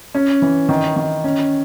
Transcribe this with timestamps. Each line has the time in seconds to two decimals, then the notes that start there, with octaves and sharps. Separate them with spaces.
0.14 C#4
0.42 E3
0.69 D#3
0.96 D#3
1.24 C#4